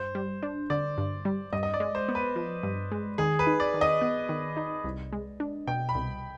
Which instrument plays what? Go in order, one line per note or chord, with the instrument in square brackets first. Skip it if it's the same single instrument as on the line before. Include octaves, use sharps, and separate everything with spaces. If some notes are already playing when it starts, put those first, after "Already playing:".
Already playing: [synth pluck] G2 [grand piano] C5
[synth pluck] G3
D4
[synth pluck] D3 [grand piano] D5
[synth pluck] G2
G3
[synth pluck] G2 [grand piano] D#5
[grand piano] D#5
D5
[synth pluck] G#3
[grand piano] C5
[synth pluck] B3
[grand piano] B4
[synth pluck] F3
G2
G#3
[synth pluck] D#3 [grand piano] G#4
[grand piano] B4
[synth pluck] D#4
[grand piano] D5
[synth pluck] D#3
[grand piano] D#5
[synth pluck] B3
D#3
D#4
C2
G#3
D4
[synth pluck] B2 [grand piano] G5
[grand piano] B5
[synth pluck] C2